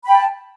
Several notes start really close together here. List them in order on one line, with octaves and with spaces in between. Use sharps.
B5 G5 A5